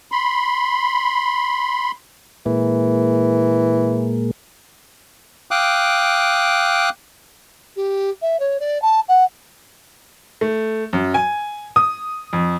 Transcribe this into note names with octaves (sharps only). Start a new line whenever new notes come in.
B5 C6
A#2 E3 G#3 A#3
F5 G5 D6 D#6 F#6
G4
E5
C#5
D5
A5
F#5
A3
F#2
G#5
D#6
F2